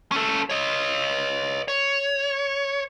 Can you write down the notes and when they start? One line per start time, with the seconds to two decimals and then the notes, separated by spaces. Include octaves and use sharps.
0.12 C#4 A4
0.50 C#5 D#5
1.68 C#5